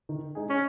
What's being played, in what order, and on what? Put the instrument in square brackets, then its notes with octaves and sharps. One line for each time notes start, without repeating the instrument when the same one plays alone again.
[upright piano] D#3
G#3 D#4 G#4
[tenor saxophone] C#4